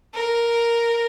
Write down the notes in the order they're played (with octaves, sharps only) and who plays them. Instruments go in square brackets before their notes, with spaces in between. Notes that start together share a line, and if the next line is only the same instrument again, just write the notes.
[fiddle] A#4